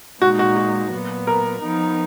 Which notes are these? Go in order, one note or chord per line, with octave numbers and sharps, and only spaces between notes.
A#2 G#3 D#4 F#4
F#4
F#4
A#2 F#3 B3
A#4
F3 B3 D#4